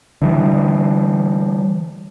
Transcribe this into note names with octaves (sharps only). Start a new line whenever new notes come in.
D3 E3 G3